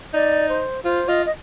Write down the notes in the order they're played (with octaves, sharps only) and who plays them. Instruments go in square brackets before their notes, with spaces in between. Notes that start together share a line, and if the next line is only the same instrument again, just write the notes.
[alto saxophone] D#4 [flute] D5
[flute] C5
[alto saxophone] F4 [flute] C5
[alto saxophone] F4 [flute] D#5
[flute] D#5